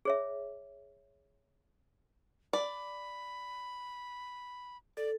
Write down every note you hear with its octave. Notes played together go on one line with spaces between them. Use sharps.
G#4 C#5 E5
D5 B5
A4 D5